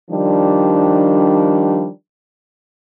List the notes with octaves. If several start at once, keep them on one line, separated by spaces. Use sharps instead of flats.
D#3 F3 G3 D4